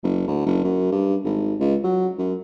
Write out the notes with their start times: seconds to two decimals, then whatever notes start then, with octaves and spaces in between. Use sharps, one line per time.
0.03 F#1
0.28 D2
0.46 F#1
0.64 F#2
0.92 G2
1.24 G#1
1.60 C#2
1.84 F#3
2.19 F#2